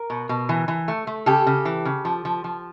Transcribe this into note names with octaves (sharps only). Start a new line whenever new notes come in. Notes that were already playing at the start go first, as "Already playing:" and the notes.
Already playing: A#4
B2
B2
E3
E3
A3
A3
C#3 G4 A4
C#3
E3
C#3
F3
F3
F3